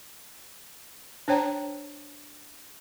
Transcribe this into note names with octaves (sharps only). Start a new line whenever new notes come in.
D4 C5 C#5 G5 A#5